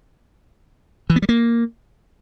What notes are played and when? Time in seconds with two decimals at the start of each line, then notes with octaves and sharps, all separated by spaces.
1.10 E3
1.16 B3
1.22 G3
1.29 A#3